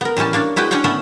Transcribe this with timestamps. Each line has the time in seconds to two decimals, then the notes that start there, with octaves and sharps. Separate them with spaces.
0.01 B3 A#4
0.17 A2 E3 G3 C#4 A5
0.33 A#3 D4 C#5 D5
0.56 G#3 E4 F#4 B4 G5
0.71 C#4 D4 C#5 D5 F#5 G5
0.84 A3 B3 C#4 A4 E5